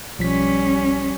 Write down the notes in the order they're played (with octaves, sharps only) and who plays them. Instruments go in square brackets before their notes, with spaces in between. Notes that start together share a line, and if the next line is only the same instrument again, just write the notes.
[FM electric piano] B1 F3 B6 [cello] G3 C#4